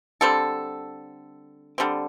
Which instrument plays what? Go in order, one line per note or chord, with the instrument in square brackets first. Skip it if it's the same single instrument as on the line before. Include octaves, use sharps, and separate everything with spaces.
[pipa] D3 G3 C4 A4
D3 G3 C4